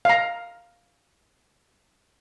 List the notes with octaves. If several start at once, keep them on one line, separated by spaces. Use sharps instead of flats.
F5 A#5